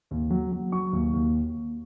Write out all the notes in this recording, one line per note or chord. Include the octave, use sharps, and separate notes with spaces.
D#2
F#3
F#3
F#3 C#6
D#2
D#2